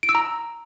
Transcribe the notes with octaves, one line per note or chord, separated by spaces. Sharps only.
D7
E6
A#5